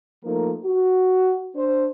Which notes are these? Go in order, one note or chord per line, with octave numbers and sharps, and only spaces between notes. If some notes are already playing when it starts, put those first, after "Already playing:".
F3 A3 A#3 D#4 A#4
F#4
D4 C5